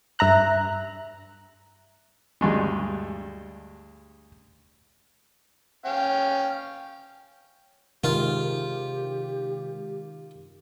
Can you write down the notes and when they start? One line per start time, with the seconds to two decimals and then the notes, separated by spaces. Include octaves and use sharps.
0.19 G2 E5 A#5 F#6
2.41 D2 G2 G#3
5.85 C#4 F5 G5
8.04 C3 D#3 G#3 F4 G4